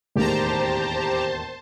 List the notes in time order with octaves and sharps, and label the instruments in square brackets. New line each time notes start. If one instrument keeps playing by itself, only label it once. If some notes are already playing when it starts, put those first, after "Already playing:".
[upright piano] E1 D#2 A2 [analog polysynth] G4 A#5 [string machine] C5 A5